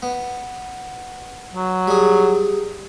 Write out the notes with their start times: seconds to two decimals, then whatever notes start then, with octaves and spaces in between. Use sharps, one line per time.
0.03 B3
1.54 F#3
1.88 G3 G#4